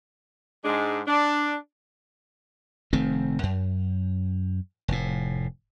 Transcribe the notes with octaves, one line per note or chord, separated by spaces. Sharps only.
G#2 G#3 D4
D4
F1 D#3 A3 C4
F#2
F1 A2